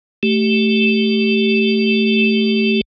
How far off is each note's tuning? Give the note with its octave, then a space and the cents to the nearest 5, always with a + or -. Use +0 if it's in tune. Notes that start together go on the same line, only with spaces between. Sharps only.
A3 +0 G4 -10